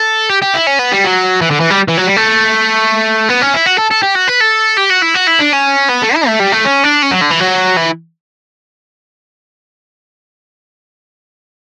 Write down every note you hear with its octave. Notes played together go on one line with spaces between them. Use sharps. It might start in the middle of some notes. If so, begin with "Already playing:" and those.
Already playing: A4
G4
G4
E4
C#4
B3
G3
F#3
E3
D3
E3
G3
E3
F#3
G3
A3
B3
C#4
E4
F#4
A4
A4
G4
F#4
B4
A4
G4
F#4
E4
F#4
E4
D4
C#4
B3
A3
E4
A3
G3
A3
C#4
D4
C#4
F#3
D3
E3
F#3
E3